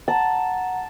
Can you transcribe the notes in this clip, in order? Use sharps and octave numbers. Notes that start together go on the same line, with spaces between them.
F#5 A5 A#5